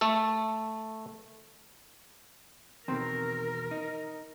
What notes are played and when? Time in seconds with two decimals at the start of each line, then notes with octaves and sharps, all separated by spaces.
0.01 A3 A4
2.88 E2 B2 D#3 C4 A#4
3.71 D#4